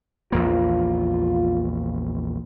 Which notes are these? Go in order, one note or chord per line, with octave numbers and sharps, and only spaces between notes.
A#1 E2 A#3 F4